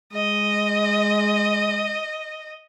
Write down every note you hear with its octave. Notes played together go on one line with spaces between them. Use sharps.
G#3 D#5